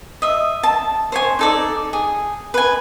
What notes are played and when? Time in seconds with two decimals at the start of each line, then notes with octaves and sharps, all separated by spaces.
0.22 D#5 E5
0.63 A5
1.12 C5 C#5 G#5
1.39 D#4 A4 D5
1.93 G#4
2.54 B4 G#5